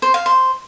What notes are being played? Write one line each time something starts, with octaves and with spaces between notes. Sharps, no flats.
C5
F5
C5